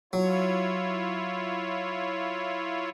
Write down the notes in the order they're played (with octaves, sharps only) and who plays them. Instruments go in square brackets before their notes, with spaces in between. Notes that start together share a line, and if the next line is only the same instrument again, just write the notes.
[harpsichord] F#3 [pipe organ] E4 F4 C#5